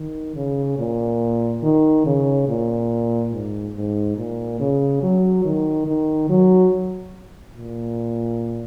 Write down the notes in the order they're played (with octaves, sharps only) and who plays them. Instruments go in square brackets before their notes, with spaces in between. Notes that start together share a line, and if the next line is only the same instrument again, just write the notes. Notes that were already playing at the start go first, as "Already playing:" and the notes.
Already playing: [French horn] D#3
C#3
A#2
D#3
C#3
A#2
G#2
G#2
A#2
C#3
F#3
D#3
D#3
F#3
A#2